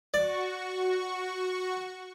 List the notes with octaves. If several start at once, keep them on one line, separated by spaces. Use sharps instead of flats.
F#4 D5 C#6